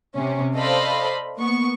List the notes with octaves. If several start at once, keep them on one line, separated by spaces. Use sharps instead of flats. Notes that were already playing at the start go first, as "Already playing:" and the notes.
C3 C#4
A4 C5 D5 D#5 F5 B5
A#3 B3 C#6